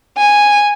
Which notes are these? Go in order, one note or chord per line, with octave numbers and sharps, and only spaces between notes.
G#5